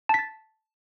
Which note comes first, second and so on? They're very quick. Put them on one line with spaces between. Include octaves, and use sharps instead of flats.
A5 B6 A6